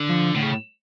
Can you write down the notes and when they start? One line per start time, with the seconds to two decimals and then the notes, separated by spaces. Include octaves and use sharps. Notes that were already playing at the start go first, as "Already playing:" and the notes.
Already playing: D3
0.09 F3
0.35 A2 D3
0.43 C#3